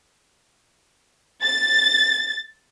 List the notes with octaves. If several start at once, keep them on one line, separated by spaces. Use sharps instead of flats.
A6